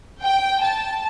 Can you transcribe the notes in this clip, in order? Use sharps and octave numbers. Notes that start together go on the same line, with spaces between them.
G5
A5